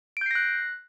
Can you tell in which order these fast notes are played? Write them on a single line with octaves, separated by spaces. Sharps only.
D7 G6 C7 A#6 F#6